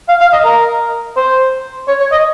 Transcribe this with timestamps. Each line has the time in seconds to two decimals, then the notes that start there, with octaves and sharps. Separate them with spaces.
0.09 F5
0.20 F5
0.33 D#5
0.44 A#4
1.17 C5
1.88 C#5
2.00 C#5
2.12 D#5